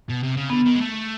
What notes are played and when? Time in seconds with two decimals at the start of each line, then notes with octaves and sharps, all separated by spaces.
0.10 B2
0.23 C3
0.37 C#3
0.50 D3 B3
0.65 D#3
0.75 G#3
0.81 A3